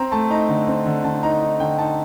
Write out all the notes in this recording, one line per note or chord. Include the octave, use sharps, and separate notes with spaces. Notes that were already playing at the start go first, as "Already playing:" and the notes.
Already playing: C4 A#5
A3 A5
D#4 A#5
D3
C4
D3
D3 A5
D#4 A#5
D#4
D3 G5
D#4 A5